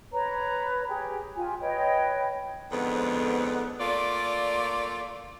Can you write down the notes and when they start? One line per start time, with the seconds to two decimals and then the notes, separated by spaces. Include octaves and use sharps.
0.12 B4 C#5 A#5
0.88 G4 G#4
1.35 F4 G4 G#5
1.61 B4 C#5 D#5 G5
2.72 F2 G#2 D3 B3
3.80 A3 A#3 F4 D5